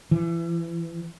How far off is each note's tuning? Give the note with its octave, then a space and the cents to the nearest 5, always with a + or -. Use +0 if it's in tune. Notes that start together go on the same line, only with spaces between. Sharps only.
E3 +30